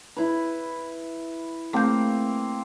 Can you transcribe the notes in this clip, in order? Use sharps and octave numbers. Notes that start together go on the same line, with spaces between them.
E4 B4
A3 A#3 C4 G6